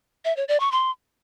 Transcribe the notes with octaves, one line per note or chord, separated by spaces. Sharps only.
E5
C#5
D5
C#6
C6